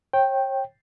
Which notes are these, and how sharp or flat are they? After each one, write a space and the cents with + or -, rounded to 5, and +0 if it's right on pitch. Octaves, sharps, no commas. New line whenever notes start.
C#5 -40 G5 +0